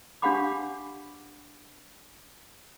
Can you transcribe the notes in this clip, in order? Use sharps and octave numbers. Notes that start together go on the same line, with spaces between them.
D4 G4 F5 F#5 B5 D6